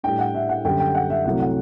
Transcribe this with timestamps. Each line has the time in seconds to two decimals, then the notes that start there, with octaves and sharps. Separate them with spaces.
0.03 A2 G3 D4 G5
0.19 F#5
0.35 E5
0.49 F#5
0.65 F#2 D3 G3 G5
0.80 G5
0.95 F#5
1.10 E5
1.25 C2 C3 F#3 A3 F#5
1.40 F#5